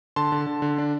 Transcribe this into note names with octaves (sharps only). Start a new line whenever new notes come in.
D3 A5 C6
D3
D3
D3
D4